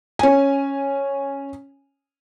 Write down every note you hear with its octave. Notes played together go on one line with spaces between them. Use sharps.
C#4 G#5